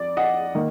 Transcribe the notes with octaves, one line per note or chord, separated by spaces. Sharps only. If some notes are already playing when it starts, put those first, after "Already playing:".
Already playing: F2 D5
D#5 F#5
D#3 A#3